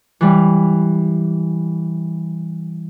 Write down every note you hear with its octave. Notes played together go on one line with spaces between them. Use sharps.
E3 G3